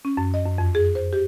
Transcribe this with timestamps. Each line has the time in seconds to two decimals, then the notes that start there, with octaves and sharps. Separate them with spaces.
0.05 C#4
0.17 F#2
0.34 D#5
0.45 F#2
0.58 F2
0.75 G#4
0.95 C5
1.13 G4